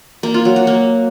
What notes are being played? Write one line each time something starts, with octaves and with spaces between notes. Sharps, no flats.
A#3
F4
F#3
F#4
A#3